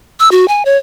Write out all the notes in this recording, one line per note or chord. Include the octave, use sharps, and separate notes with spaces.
E6
F#4
G#5
C#5